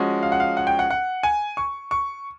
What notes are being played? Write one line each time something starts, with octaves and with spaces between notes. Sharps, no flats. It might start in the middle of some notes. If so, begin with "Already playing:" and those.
Already playing: F3 G#3 C#4 F#4
F5
F#5
F5
F#5
G5
F#5
F#5
G#5
C#6
C#6